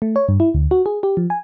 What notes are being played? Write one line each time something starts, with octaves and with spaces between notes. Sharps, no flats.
A3
C#5
G2
E4
D2
F#4
G#4
G4
F3
G#5